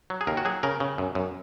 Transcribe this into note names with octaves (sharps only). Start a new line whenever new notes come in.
F#3
G#4
D#2 A#4
F#4
F#3 G#4
C#3 A#4
C#3
F#2
F#2